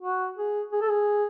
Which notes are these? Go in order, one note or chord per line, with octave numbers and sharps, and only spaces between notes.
F#4
G#4
G#4
A4
G#4